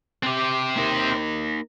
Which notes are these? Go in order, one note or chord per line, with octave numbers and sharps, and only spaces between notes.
C4 G4
A#3 D#4 A#4